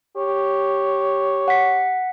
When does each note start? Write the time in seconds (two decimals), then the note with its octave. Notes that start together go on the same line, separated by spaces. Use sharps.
0.17 G4 C#5
1.48 F#5 B6